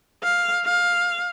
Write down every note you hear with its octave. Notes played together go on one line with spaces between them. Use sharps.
F5
F5